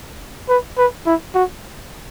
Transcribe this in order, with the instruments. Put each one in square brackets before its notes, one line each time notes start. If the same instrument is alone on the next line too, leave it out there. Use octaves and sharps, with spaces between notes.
[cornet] B4
B4
E4
F#4